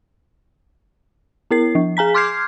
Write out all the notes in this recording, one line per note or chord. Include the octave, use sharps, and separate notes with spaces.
B3 E4 A#4 C7
F3
G#4 G#5 A#5 B6
C6 D6 F6 G6 G#6 C7